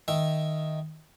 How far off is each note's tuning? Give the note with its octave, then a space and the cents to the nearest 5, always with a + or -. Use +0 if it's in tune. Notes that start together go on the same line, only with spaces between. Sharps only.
D#3 +0 E5 +0